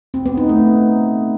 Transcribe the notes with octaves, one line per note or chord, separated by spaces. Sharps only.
C4
B3
D#4
A3